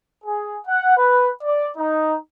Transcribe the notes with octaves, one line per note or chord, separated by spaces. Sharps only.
G#4
F#5
B4
D5
D#4